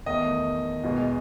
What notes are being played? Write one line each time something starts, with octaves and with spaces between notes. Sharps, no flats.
E2 D#3 A3 D#5
E2 B2 G#3